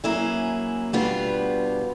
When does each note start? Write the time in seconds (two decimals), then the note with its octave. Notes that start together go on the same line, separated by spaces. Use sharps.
0.04 F#3 A#3 C#4 E4 G#4
0.93 B2 G3 B3 D4 F4